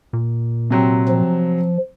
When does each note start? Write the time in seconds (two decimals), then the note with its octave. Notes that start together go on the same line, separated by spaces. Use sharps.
0.13 A#2
0.70 C3 F#3 C4
1.08 F3